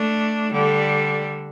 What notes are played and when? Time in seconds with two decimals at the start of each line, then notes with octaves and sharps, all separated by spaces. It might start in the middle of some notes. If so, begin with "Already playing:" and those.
Already playing: A3 D4
0.52 D3 G3